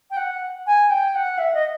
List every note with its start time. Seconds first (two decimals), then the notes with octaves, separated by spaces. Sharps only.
0.11 G5
0.17 F#5
0.67 G#5
0.90 G5
1.15 F#5
1.38 E5
1.54 D#5